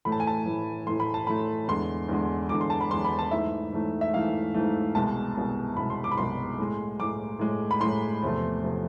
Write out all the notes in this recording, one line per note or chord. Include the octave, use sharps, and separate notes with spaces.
A2 E3 A3 B5
A5
G#5
A5
A2 E3 A3
A2 E3 A3 C6
B5
A5
A2 E3 A3 B5
E2 D3 G#3 C6
E2 D3 G#3
E2 D3 G#3 D6
C6
A5
B5
E2 D3 G#3 C6
B5
A5
G#2 E3 A3 E5
G#2 E3 A3
E5
G#2 E3 A3 F5
G#2 E3 A3
C2 B2 G#3 A5
C2 B2 G#3
C2 B2 G#3 B5
C6
D6
B5
C2 B2 G#3 C6
A2 G#3
A2 G#3 D6
A2 G#3
B5
A2 G#3 C6
E2 C3 F3 A3
C3 F3 A3